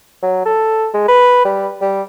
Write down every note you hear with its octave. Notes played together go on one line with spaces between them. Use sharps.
F#3
A4
G#3
B4
G3
G3